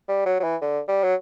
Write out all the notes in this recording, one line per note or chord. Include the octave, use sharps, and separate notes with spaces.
G3
F#3
F#3
E3
D3
G3
F#3